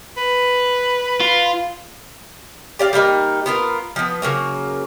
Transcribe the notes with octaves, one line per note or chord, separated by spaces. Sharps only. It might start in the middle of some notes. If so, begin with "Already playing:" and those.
B4
F4
G4 D5 F5
G3 A3 A#3 D#4
B3 F4 A#4
F3 B3
C#3 F#3 A#3